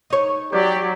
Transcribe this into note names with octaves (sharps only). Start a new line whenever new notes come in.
D#4 C#5
F#3 G4 D5